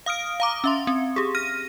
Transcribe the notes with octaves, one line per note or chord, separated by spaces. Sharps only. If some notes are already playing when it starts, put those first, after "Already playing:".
F5 D#6 F6 D7
F5 A#5 D6
C#4 E5 C6
C4
G4 G#4
F6 A#6 D#7